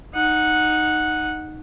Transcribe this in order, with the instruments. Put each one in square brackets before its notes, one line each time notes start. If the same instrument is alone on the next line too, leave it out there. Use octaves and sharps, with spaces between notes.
[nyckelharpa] D#4 F#5